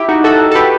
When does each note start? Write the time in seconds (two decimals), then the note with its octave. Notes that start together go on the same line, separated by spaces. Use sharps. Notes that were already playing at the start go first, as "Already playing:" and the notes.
Already playing: E4 G4
0.09 D#4 F#4
0.24 F#4 A4
0.52 A4
0.55 G4 B4